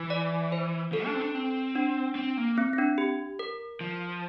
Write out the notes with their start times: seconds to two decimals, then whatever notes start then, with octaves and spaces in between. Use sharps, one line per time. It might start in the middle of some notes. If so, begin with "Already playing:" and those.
Already playing: E3
0.10 D5
0.52 C5
0.92 F3 A4
1.06 D4
1.14 C4
1.21 D4
1.34 C4
1.75 D4
2.15 C4
2.37 A#3
2.58 C4
2.73 C4
2.78 D4
2.98 G4
3.39 A#4
3.81 F3